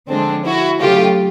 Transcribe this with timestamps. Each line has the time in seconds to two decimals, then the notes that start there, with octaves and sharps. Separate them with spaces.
0.10 D3 F3 G#3 C4 D4
0.45 E4 F#4
0.80 C#3 F#3 A3 F4 G4